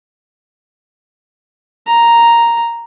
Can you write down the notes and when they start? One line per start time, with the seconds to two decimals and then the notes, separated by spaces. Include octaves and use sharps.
1.87 A#5